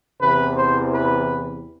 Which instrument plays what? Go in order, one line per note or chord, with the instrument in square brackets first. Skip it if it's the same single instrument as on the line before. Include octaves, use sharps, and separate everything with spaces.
[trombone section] E2 C3 E3 B4
C5
B4